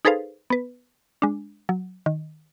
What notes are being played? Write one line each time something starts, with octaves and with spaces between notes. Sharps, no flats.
D#4 G#4 A4 B4 C5 F5
B3 B4
G#3 D4
F#3
D#3